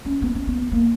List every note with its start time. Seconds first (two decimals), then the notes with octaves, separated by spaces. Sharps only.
0.05 C#4
0.22 B3
0.35 C#4
0.47 B3
0.72 A#3